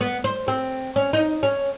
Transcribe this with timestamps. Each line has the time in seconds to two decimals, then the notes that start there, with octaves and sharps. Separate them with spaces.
0.01 B3
0.24 C5
0.48 C4
0.96 C#4
1.13 D#4
1.43 C#4